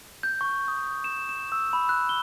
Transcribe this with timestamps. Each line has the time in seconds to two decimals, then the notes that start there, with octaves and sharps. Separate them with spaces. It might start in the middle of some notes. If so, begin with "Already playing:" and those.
0.23 G6
0.41 C#6
0.68 D#6
1.04 E7
1.29 E7
1.52 E6
1.73 B5
1.89 F#6
2.09 G7